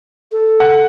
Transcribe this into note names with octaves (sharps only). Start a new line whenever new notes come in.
A4
F#5